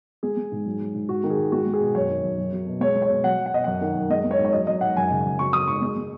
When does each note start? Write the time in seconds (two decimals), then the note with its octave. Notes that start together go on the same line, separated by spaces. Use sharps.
0.23 G#3 G#4
0.37 G#3
0.52 G#2
0.66 F#3
0.80 F#3
0.94 G#2
1.09 G#2 F#4
1.24 D#3
1.30 G#4
1.38 G#2
1.52 G#3 F#4
1.66 G#3
1.73 G#4
1.80 B2
1.95 F#2 C#5
2.09 D#3
2.23 F#2
2.38 F#3
2.52 F#3
2.67 B2
2.81 G#3 C#5
2.95 G#3
3.02 C#5
3.09 B2
3.24 F#3 F#5
3.38 F#3
3.46 F#5
3.53 B2 D#5
3.64 F#2 F#5
3.81 D#3
3.95 F#2
4.10 G#3 D#5
4.24 G#3
4.31 C#5
4.39 G#2
4.45 C#5
4.52 F#3 D#5
4.67 F#3 D#5
4.81 G#2 F#5
4.96 F#2 G#5
5.11 C#3
5.25 F#2
5.39 F#3 C#6
5.53 F#3 D#6
5.67 G#2 C#6
5.82 G#3
5.96 G#3